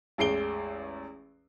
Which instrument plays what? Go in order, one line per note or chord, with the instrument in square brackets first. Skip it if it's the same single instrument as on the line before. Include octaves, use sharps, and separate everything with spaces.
[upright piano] A1 E2 G#3 C7 D7 G7